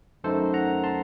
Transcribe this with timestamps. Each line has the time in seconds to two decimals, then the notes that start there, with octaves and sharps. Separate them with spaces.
0.24 F#2 D#3 A3 D#4 A4 C5
0.53 F#5 A#5
0.84 A5 C6